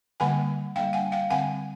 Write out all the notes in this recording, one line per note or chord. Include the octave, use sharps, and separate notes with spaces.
D3 G3 A#3 F#5 G#5
G3 A#3 D4 F5 G5
F#5 G#5
F5 G5
D3 G3 C4 F#5 G#5